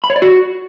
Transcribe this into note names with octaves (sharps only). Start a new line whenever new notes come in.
B5
C#5
D5
F#4